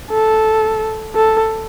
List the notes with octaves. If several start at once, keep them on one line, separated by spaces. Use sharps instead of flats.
A4
A4